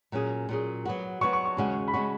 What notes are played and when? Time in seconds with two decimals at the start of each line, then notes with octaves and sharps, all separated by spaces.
0.12 A#2 F#3 C#4 G#4
0.49 A#2 F#3 C#4 G#4
0.85 F#3 B3 F#4
1.21 F#3 B3 F#4 C#6
1.33 C#6
1.45 C#6
1.57 D#2 C#3 G#3 C#4 F#4 C#6
1.88 B5
1.93 C#3 G#3 C#4 F#4 C#6